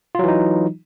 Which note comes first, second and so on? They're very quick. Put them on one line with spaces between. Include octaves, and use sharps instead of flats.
F4 F#3 E3 D#4